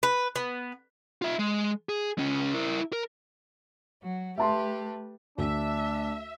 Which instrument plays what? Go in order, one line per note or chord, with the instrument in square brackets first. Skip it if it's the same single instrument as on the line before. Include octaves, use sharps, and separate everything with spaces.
[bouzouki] B4
B3
[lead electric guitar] F4 E5
G#3
G#4
C#2 C#4
E4 A#4
A#4
[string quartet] F#3 F#4
[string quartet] A3 G4 B4 [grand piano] E5 A5 C6
[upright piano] D2 [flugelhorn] D4 [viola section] E5